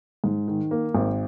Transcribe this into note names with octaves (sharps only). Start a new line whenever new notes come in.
G#2
D#3
A#3
G#1